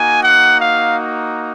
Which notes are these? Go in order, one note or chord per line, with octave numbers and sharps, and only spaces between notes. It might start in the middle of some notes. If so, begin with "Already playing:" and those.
Already playing: A#3 D#4 F#4 G#5
F#5
F5